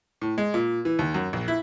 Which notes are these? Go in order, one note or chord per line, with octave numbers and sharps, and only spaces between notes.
A2
G#3
A#2
E3
D#2
F#2
A#1
E4